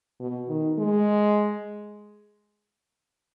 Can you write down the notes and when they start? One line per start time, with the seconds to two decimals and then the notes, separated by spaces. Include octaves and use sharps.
0.20 B2
0.48 D#3
0.78 G#3